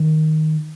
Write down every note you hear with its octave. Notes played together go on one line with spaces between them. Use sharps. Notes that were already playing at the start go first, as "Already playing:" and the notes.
Already playing: D#3